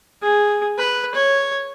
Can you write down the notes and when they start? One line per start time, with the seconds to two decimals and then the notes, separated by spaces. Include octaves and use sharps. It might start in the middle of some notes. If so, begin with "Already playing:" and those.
0.23 G#4
0.78 B4
1.15 C#5